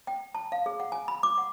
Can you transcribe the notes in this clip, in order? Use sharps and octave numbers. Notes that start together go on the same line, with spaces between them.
G5
A5
F5
G#4
F#5
G#5
B5
D6
F#5